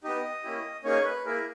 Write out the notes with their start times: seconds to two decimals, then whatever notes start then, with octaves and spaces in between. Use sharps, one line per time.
0.04 B3 D#4 G4 D#5
0.43 A#3 C#4 E4 G4
0.84 A#3 C#4 D#4 G#4 C#5
1.04 B4
1.25 A#3 E4 G#4 A#4